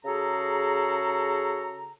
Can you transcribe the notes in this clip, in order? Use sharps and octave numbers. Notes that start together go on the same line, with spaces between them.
C#3 F#4 G#4 A4 A#5